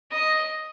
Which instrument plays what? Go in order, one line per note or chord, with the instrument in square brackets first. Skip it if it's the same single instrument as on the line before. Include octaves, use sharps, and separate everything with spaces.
[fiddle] D#5